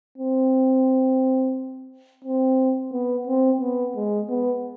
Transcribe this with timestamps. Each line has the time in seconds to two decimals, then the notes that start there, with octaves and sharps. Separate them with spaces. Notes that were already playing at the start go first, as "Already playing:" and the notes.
0.18 C4
2.24 C4
2.93 B3
3.27 C4
3.61 B3
3.96 G#3
4.29 B3